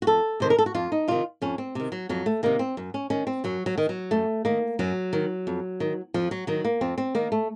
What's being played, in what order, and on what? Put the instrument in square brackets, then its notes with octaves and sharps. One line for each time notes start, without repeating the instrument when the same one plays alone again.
[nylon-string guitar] F#4
F2 A4
C3 D#3 C5
A#4
A4
F#4
F2 F4
D#4
C3 D#3 F4
F2 C#4
C4
C3 D#3
F#3
F2 F#3
A3
C3 D#3 A#3
C4
F#2
C#4
D#3 C#4
C4
F#2 F#3
F#3
D#3
F#3
F#2 A3
D#3 A#3
F#2 F#3
D#3
F2
D#3
F2 F3
F#3
D#3 F#3
A#3
F2 C4
C4
D#3 A#3
A3